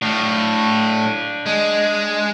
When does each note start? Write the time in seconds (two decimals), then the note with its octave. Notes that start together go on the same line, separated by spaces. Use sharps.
0.02 A2 D4 F5
1.46 G#3